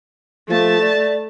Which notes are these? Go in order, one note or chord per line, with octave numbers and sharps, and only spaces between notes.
F3 A3 A5
D5